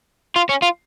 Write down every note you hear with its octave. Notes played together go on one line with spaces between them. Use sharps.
F4
C#4
F4